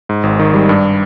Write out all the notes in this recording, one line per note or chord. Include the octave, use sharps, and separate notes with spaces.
G#2
G#1
D#3
G3
G2